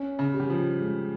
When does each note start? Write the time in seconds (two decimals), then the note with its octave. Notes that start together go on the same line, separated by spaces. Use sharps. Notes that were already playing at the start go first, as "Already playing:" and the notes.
Already playing: C#4
0.19 C#3
0.34 G4
0.40 G3
0.50 F3
0.81 G#3